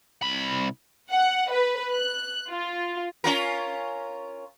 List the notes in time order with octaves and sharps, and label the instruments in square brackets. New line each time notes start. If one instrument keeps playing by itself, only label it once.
[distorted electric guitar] C2 B5
[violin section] F#5
B4
F#6
F4
[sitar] C#4 F4 A#4